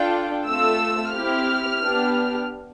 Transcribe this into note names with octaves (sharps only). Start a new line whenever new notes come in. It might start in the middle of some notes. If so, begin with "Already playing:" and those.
Already playing: D4 F4 A4 G5
A3 C4 F4 A4 E6
C4 E4 G4 F6
B3 D4 G4